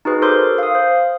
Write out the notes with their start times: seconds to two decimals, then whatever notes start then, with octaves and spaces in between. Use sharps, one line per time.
0.05 D#4 F#4 G#4 B4
0.22 A4 A#4 C5 C6 D6 F#6
0.58 F5 D#6
0.75 C5